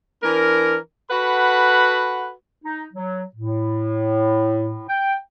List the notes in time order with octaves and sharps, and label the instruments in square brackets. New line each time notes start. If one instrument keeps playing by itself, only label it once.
[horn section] E3 D4 A#4
F#4 A4 B4 F#5 B5
[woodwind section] D#4
F#3
A2
G5